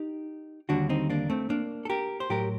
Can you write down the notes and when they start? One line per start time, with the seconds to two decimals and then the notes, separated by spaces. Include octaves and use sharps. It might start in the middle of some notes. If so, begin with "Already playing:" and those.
Already playing: D#4 G4
0.69 D#2 D3 G3 D4 F#4
0.89 C4 D#4
1.10 A#3 D4
1.30 A3 C4
1.50 A#3 D4
1.85 A4
1.90 G4 A#4
2.20 C5
2.30 A2 F#3 G4 A#4